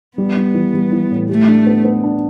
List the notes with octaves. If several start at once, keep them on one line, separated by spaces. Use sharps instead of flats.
G3 B3
G3
E3
G3
E3
A2
A3 G4
D4
B3
B3
D4